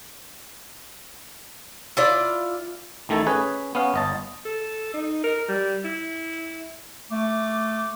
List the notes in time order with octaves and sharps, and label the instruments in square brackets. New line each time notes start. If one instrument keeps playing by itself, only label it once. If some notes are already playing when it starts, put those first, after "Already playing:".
[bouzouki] E4 F4 D5
[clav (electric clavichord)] A1 D#3 A3 E4 A5
C#4 G#4 B4 G#5
B3 C#4 F5
G1 D#5 A5
[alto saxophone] A4
D#4
A#4
G3
E4
[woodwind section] A3 D6